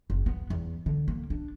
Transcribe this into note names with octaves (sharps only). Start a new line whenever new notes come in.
F#1
B3
E2
D3
A#3
D4